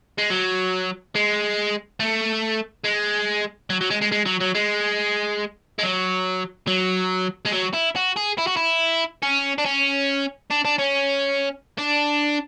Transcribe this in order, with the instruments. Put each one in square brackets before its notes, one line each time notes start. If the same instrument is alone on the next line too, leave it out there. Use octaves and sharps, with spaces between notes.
[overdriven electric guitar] G#3
F#3
G#3
A3
G#3
F#3
F#3
G#3
G#3
G#3
F#3
F#3
G#3
G#3
F#3
F#3
G#3
F#3
E4
F#4
G#4
E4
F#4
E4
C#4
D4
C#4
D4
D4
C#4
D4